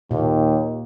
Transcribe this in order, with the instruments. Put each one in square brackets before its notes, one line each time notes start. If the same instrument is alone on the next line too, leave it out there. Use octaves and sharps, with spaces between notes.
[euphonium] D#2 [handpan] A#2